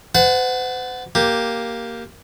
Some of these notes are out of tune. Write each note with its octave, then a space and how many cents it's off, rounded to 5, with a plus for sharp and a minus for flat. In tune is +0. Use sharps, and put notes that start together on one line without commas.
C5 -45 F#5 +0 A5 -15
A#3 +0 G4 +0